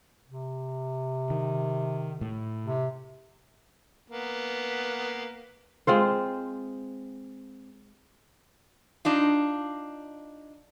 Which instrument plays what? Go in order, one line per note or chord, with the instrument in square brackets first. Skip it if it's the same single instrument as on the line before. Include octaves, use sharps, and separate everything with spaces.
[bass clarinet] C3
[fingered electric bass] D#3
A2
[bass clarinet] C3
[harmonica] A#3 B3
[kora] G#3 C4 F4 C5
[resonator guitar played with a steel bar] D4 D#4 F4